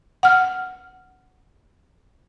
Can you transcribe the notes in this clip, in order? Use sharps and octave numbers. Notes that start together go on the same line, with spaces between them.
F#5 F6